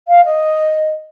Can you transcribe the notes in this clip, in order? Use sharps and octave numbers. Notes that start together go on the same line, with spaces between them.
F5
D#5